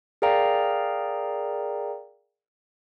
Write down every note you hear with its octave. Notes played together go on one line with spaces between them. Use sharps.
G#4 A#4 D5 F5 G5 A#5